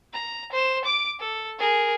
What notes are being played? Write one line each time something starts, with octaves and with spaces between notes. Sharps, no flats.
A#5
C5 E7
D6 D7
A4
G#4 A#4